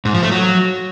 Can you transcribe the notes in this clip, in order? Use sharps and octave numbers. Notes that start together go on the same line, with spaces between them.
G#2
F3
A3
F#3